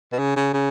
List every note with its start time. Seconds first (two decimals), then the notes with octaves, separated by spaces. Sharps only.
0.12 B2
0.19 C#3
0.36 C#3
0.54 C#3